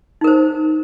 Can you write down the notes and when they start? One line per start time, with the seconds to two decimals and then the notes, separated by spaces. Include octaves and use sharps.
0.21 D#4
0.24 A#4
0.27 C5